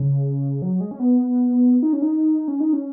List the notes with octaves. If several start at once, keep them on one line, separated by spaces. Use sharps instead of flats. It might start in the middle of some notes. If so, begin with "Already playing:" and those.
Already playing: C#3
F#3
G#3
C#4
B3
D#4
C#4
D#4
C#4
D#4
C#4